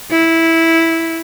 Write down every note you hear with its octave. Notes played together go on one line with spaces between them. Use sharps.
E4